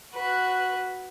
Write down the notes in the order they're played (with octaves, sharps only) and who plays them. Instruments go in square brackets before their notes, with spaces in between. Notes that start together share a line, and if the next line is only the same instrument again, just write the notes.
[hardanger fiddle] F#4 B4